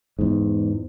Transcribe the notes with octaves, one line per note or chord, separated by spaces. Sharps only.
E2 G#2